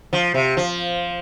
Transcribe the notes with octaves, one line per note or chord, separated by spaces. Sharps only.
F3
C3
F3